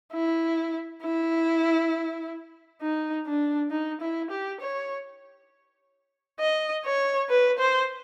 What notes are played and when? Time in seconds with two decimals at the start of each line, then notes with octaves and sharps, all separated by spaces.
0.13 E4
1.03 E4
2.82 D#4
3.27 D4
3.71 D#4
4.01 E4
4.31 G4
4.61 C#5
6.40 D#5
6.86 C#5
7.30 B4
7.59 C5